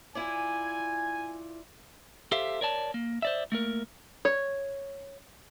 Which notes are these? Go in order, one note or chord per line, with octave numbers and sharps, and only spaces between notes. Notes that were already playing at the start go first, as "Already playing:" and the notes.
E4 F4 D5 G#5
G4 A4 C5 E5 F5
A#4 C#5 D5 A5
A#3
C5 D5 E5
A3 A#3 A#4
C#5